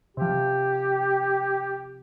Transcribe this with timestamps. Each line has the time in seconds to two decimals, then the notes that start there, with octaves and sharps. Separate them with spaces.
0.17 C3 F3 G4